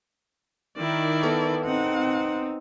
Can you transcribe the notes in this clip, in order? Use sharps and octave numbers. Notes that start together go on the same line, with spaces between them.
D#3 E4 D5
B3 A4 A#4
C4 D#4 F#5